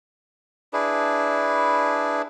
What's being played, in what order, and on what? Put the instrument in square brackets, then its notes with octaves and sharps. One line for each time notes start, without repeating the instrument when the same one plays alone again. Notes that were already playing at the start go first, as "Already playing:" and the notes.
[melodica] D4 E4 G#4 B4